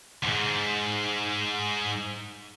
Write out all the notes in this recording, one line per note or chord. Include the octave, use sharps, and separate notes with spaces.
D2 G#2